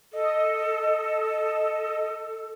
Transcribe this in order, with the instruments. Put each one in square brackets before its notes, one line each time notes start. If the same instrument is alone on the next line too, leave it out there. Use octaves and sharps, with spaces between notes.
[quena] A4 [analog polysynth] D#5